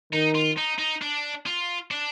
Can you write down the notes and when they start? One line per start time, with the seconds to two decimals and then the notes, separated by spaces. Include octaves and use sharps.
0.13 D#3 D#4
0.35 F4
0.58 D#4
0.79 D#4
1.02 D4
1.46 F4
1.91 D4